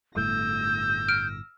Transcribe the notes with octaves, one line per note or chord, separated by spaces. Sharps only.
G1 A2 A3 E6 G6 A#6
F6 D7